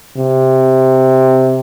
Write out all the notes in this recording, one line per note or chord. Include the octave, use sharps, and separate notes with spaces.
C3